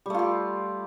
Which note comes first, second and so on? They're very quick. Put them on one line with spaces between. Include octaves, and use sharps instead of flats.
G3 A3 F4 G4